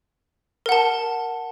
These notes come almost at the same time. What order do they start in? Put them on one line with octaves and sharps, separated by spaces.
A#4 F#5 A5